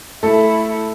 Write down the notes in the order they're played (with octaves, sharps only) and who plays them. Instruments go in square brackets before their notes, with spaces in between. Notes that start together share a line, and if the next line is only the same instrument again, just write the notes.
[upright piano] A3 A4 [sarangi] E4